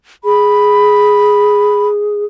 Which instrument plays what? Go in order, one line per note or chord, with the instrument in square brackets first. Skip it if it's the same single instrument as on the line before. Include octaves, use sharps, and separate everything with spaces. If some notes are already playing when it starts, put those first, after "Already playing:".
[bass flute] G#4 [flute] B5